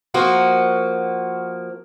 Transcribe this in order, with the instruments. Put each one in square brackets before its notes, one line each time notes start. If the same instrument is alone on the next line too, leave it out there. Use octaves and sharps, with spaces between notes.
[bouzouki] F3 A#3 F#4